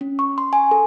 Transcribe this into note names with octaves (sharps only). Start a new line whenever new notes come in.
C#4
C#6
C6
G#5
A4